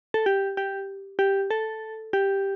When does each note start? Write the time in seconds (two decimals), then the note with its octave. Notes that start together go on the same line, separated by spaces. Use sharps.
0.14 A4
0.26 G4
0.57 G4
1.19 G4
1.51 A4
2.13 G4